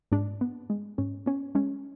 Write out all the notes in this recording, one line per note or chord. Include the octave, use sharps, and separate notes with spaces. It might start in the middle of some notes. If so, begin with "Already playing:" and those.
G#2 D4
B3
G#3
G#2 C#4
B3 C#4
G#3 C#4